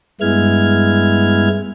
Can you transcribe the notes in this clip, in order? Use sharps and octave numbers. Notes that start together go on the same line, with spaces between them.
G2 G#3 B3 E4 F6 G#6